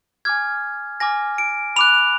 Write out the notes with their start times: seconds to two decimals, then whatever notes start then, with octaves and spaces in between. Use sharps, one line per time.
0.25 G#5 D6 F6 G#6
1.00 G#5 D6 F6 A#6
1.38 D7
1.76 B5 D6 F#6 F7